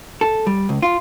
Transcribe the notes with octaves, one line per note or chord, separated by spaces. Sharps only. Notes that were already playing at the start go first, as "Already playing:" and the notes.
A4
G3
C#2
F4